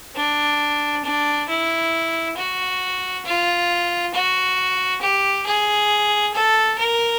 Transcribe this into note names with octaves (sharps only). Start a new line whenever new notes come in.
D4
D4
E4
F#4
F4
F#4
G4
G#4
A4
A#4